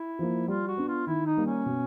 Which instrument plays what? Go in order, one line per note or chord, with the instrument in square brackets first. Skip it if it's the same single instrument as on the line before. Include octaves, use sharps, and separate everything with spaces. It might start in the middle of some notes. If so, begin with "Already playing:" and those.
Already playing: [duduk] E4
[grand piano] F3 A#3
[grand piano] G3 [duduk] F4
[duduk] F#4
[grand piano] B3 D4
[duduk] F4
[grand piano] D#3 [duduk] E4
[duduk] D#4
[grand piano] G3 A#3
[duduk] C#4
[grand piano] B2